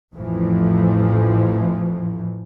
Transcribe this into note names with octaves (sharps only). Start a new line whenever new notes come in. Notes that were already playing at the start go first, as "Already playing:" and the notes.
A1 F2 A2 E3 F3